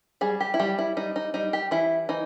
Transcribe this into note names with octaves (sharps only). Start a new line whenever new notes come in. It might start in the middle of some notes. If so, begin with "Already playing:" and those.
G3 G#4
G4
E4
G3 G4
E4
G3 D#4
D#4
G3 D#4
G4
E3 E4
E3 D#4